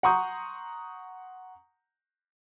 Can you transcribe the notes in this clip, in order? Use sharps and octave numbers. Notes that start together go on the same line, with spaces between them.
F#5 A#5 C6 C#6 D#6 G6